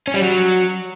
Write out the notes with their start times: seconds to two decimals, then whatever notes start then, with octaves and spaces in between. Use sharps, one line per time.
0.07 C#4
0.14 G3
0.21 F#3